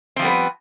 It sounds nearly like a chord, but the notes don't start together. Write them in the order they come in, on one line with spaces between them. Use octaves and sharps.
C4 F3 G3 B3 B4